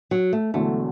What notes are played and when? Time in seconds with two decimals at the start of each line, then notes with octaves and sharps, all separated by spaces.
0.11 F#3
0.33 A3
0.54 E1 E2 D3 F#3 A3